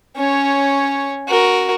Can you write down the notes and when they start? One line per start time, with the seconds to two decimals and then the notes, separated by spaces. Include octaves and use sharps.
0.17 C#4 C#5
1.28 F#4 A#4